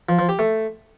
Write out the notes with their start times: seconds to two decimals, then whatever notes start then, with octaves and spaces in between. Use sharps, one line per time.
0.09 F3
0.19 F3
0.29 G4
0.39 A3